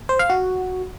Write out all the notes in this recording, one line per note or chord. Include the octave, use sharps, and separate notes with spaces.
C5
F5
F#4